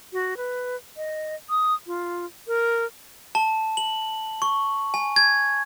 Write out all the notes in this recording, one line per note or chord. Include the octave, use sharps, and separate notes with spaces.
F#4
B4
D#5
D#6
F4
A#4
A5
F#7
C#6
G#5
G#6